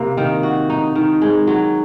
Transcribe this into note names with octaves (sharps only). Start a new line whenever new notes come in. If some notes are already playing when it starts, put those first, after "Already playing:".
Already playing: C3 A#3
D#3
F#4
D#4
D#3
G#3
F#3